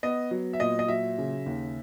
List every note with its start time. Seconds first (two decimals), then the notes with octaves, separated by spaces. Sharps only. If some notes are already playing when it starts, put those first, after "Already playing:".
0.03 B3 D#5
0.31 F#3
0.53 E5
0.60 A#2 D#5
0.79 D#5
0.88 F#3 E5
1.18 C#3
1.46 D#2